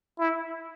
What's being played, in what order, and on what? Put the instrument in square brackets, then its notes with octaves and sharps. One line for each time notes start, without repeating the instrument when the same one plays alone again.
[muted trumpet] E4